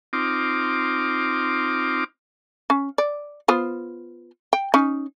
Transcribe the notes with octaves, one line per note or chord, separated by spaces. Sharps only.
C4 D#4 F4 D6
C#4
D5
B3 F4 C5
G5
C#4 D#4